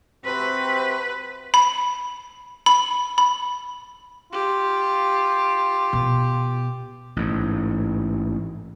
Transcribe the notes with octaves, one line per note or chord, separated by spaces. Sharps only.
C3 C4 F#4 B4
B5
B5
B5
F4 G4
B2
A1 G#2